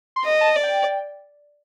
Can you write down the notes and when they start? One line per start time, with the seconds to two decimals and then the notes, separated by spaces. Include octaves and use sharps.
0.16 C6
0.25 D#5
0.41 A5
0.56 D5
0.63 G5